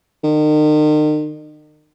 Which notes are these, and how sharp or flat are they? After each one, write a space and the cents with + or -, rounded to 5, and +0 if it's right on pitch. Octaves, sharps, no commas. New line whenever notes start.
D#3 -40